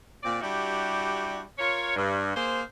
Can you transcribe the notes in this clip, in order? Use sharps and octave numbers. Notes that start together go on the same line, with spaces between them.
A#2 C4 D5
G3 D4 E4 F#4 G4
F4 A#4 C#5
G2
A#3 G#4 C5